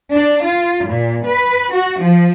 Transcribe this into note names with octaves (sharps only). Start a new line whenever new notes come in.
D4
F4
A#2
B4
F#4
F3